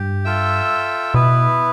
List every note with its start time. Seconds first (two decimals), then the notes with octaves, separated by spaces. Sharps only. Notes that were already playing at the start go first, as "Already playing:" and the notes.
Already playing: G2 G4
0.24 F4 A4 E5 G5
1.14 B2 B3 E4 B4